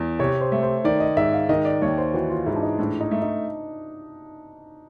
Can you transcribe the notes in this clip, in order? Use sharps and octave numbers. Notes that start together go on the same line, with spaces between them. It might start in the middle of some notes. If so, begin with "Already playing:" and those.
Already playing: E2
C3 C#5
C5
A3
C5
D#3 D5
D#5
G#2 E5
F5
D#3 D#5
D5
D#2 C#5
C5
E3 F#4
F4
G#2 E4
D4
D#4
A2 D4
D#4
A3
D#4